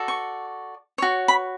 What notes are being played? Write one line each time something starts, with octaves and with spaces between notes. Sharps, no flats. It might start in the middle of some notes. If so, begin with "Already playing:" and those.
Already playing: F#4 A4 D5
C#6
F#4 C#5
B5